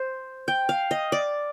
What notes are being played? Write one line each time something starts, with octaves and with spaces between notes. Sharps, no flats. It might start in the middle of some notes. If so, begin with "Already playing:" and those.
Already playing: C5
G5
F5
D#5
D5